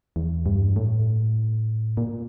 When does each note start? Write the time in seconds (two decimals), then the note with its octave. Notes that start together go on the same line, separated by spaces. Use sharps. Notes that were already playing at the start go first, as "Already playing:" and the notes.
0.16 E2
0.46 G2
0.76 A2
1.97 A#2